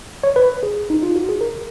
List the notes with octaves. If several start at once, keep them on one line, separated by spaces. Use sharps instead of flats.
C#5
B4
G#4
D#4
F4
F#4
G#4
A#4